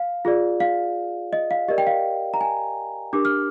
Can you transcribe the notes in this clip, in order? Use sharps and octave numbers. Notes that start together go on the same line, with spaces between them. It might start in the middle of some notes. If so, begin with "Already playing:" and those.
Already playing: F5
F4 G#4 D5
F5
D#5
F5
G4 A#4 D5 D#5
G5
F5
A#5
G#5
D4 G4 A#4 D6
F6